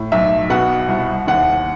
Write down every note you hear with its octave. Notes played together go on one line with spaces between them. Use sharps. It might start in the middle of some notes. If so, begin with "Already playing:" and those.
Already playing: A2
B1 E5
B2 F#5
C2
D#2 F#5